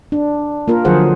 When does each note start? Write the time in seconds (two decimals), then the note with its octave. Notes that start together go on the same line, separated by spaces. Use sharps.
0.12 D4
0.68 A#3 F4 A#4
0.85 D3 F3 F#3 G#4 C5 F#5